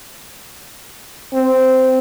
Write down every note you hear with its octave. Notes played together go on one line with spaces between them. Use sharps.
C4